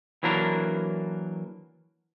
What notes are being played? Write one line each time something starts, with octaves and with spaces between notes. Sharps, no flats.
E3 F#3 A#3 D4 A#4